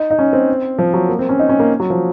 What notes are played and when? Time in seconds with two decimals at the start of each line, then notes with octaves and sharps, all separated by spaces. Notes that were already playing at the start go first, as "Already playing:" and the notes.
Already playing: D#4
0.10 D#4
0.19 C#4
0.33 C4
0.79 F3
0.94 F#3
1.09 A#3
1.19 C4
1.29 C#4
1.39 D#4
1.49 C#4
1.59 A#3
1.80 F#3
1.90 F3